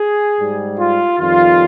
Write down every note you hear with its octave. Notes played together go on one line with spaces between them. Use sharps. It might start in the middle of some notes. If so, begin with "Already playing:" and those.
Already playing: G#4
G#2 G3
F4
F2 D#3 G3 F4